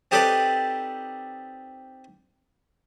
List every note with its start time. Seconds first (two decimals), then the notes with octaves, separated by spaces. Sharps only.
0.11 C4 D#4 G4 A4 B4 D5